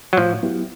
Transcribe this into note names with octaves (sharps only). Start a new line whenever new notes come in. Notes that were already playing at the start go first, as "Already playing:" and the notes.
F#3
A2 F3
F#3 B3 E4 G4